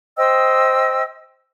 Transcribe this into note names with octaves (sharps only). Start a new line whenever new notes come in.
C5 D#5 G5 E6